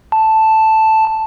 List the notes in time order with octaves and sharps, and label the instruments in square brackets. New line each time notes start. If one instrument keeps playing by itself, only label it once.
[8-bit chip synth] A5